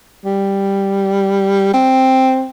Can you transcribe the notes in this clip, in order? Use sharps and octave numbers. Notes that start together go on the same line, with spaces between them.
G3
C4